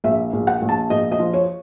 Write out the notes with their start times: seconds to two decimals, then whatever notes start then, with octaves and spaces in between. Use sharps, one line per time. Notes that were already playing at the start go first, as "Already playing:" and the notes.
0.04 A#1 E5
0.33 A#1
0.47 F#5
0.62 A#1
0.69 A5
0.90 A#1 D#5
1.12 D#5
1.19 F3
1.34 C#5